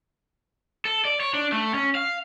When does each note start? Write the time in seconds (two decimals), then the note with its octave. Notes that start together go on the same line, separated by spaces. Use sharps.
0.85 A4
1.05 D5
1.20 C#5
1.34 D4
1.52 A3
1.74 C#4
1.95 F5